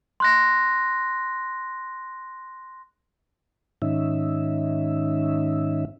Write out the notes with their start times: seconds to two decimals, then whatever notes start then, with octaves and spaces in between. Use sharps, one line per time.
0.20 C6 F#6 A#6
3.82 G#2 D#3 C#4 D#4 E5